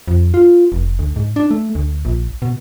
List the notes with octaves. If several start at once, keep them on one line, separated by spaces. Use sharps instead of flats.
F2
F4
F1
D2
G#2
D4
A3
D2
A#1
B2